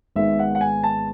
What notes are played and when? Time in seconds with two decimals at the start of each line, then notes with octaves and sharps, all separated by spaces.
0.16 G#1 G#2 G#3 B3 E5
0.39 F#5
0.55 F#5
0.61 G#5
0.83 A5